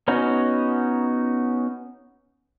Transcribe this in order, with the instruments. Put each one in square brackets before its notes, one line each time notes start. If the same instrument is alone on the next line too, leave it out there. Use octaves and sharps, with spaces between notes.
[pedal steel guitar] B3 C#4 D#4 F#4